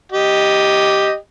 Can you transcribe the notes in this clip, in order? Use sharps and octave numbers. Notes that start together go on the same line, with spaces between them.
G4 D#5